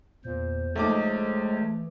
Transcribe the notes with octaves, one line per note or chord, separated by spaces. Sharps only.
E2 A#2 C5
A#1 G#3 A3 D#4 C5 C#5 D6
E3